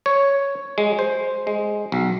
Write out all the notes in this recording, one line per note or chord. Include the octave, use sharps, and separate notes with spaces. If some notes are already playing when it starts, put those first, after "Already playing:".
C#5
G#3
C5
G#3
B1